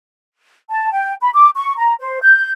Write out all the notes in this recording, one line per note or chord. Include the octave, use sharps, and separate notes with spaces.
A5
G5
B5
D6
C#6
A#5
C5
G6